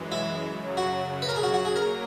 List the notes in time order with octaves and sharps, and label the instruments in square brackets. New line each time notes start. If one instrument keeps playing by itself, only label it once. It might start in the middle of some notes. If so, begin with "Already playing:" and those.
Already playing: [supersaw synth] F#2 E3 G#3
[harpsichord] E4
[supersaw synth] F#2 C#3 F#3
[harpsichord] F#4
B4
A#4
G#4
F#4
F#4
G#4
[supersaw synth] F#3 A#3 [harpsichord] A#4